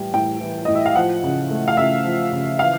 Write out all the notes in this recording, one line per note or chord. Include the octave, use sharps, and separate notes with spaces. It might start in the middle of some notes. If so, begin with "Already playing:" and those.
Already playing: A2 E3 G3 G5
A2 G5
E3
A2 D#5
E5
F5
F3 F#5
C#3
A3
F5
C#3 E5
F3
C#3
E3 F5